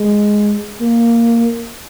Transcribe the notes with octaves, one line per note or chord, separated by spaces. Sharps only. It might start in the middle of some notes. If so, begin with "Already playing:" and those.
Already playing: G#3
A#3